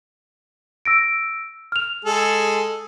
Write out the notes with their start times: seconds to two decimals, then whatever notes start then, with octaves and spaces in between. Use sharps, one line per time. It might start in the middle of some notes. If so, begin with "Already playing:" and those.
0.85 E6 A#6 D7
1.72 F6 F7
2.05 G#3 G#4 A4